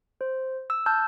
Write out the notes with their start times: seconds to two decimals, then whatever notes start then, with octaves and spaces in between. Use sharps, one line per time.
0.21 C5
0.70 E6
0.86 A5 E6 F6 G6